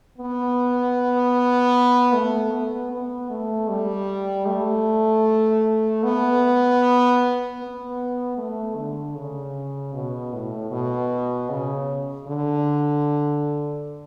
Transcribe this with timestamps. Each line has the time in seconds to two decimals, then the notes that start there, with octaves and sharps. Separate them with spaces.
0.18 B3
2.13 A3
2.53 B3
2.91 B3
3.30 A3
3.70 G3
4.47 A3
6.04 B3
7.60 B3
8.38 A3
8.77 D3
9.16 C#3
9.94 B2
10.33 A2
10.71 B2
11.50 C#3
12.27 D3